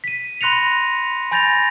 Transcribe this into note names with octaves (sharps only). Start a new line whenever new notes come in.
B6 D#7
B5 C6 F#6 A#6 C#7 F7
G#5 B5 G6 A6 A#6 F7